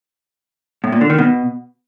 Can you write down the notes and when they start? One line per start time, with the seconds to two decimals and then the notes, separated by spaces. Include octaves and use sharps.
0.84 A2
0.92 A#2
1.01 D3
1.10 D#3
1.18 B2